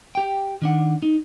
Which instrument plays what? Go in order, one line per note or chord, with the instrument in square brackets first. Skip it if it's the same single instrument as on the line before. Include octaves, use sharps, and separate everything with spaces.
[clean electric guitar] G4 G5
D#3 D4 F#5
D#4